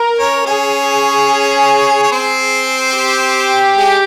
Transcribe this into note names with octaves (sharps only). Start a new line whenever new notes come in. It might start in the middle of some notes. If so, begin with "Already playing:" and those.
Already playing: A#4
C#4 C#5
C#4 G#4 C#5
C#5
C4 C5
G4
G#3 G#4